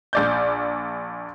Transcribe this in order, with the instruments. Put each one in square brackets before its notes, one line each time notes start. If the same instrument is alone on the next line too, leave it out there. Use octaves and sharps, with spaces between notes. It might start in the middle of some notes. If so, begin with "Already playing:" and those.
[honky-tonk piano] A#1 D5 G6